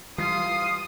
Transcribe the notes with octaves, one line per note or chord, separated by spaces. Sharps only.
E3 G3 F4 D#6 C7